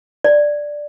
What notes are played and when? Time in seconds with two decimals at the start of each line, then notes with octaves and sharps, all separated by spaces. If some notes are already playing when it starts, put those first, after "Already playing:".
0.24 D5